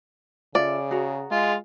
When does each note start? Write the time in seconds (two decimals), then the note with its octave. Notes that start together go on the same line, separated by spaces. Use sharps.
0.55 C#3 F4 A4 D5 E5
0.91 F#4 G#4 A#5
1.31 G#3 F4